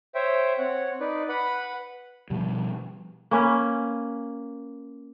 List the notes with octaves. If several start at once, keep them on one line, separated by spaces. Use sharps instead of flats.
C5 C#5 E5 G5
C4 C#5 F#5
D#4 B4 D5
B4 F#5 B5
B2 F3 G3
A#3 C#4 B4